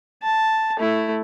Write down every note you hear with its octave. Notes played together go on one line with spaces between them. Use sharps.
A5
A3 E4